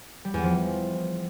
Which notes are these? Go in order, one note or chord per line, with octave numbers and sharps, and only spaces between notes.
G3
E2
F3